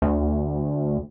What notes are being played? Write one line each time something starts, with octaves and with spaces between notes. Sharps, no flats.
D2